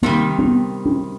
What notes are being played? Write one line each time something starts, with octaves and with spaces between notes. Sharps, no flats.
C3 D#3 G3 A#3
C4
B3
C#4